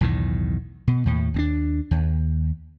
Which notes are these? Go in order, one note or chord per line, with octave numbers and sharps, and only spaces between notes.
B1 E2 A2 D#3
B2
D#2 A2
D#2 B3 D4
D#2